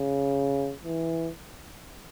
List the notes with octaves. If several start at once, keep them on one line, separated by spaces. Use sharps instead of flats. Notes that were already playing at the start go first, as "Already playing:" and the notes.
Already playing: C#3
E3